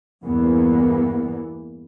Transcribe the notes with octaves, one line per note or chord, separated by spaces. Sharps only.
E2 G2 E3 A#3 B3